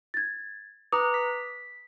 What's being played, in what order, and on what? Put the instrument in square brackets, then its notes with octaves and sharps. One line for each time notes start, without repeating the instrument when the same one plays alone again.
[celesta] G#6 A6
[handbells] B4 A#5 [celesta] D6 D#6
[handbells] B6